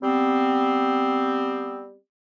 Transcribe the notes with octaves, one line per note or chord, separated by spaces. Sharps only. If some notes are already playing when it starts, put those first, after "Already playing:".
G3 B3 C4